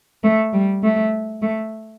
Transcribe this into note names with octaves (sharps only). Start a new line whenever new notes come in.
A3
G3
A3
A3